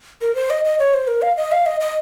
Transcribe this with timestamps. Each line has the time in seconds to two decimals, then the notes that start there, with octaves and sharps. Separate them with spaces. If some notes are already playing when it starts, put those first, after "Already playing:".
0.21 A#4
0.35 C5
0.50 D#5
0.65 D#5
0.79 C#5
0.94 C5
1.07 A#4
1.22 F5
1.37 D#5
1.52 F5
1.66 D#5
1.80 D#5